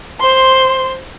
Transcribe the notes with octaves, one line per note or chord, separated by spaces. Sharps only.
C5 C6